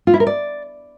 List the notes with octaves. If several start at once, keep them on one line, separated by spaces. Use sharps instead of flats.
F4
E4
A#4
D5